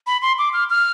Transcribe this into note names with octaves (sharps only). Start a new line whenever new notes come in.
B5
C6
D6
F6
F6